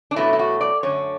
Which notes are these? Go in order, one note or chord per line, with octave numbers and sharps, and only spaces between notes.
D4
E2 B2 F#3 A3 E4
E4
F#4
D5
F#2 D3 A3 C#5